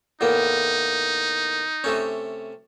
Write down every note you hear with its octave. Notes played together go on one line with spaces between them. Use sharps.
E2 A2 A#3 D#4
C3 A3 C#4